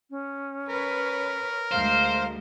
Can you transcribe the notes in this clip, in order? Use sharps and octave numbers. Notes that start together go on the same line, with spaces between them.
C#4
A#4 B4 C#5
D2 G#3 C5 F5